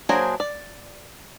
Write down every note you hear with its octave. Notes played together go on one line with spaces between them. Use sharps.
F#3 A#3 D4 G#4 C5
D5